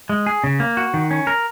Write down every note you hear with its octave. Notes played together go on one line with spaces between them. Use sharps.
G#3
G#4
C#3
A#3
F#4
D#3
C#4
A#4